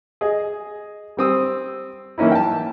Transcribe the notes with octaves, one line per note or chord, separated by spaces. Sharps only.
G#4 D#5
G3 C4 D#6 E6
E3 A#3 C#4 D#4 E4
G5 A5